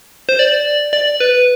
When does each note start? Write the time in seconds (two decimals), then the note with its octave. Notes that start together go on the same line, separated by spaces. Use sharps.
0.29 C5
0.39 D5
0.93 D5
1.20 B4